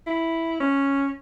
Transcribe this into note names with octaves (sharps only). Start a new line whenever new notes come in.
E4
C#4